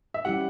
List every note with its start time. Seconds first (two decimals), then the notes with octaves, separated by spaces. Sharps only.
0.14 E5
0.25 G3 C#4 E4 G4 F#5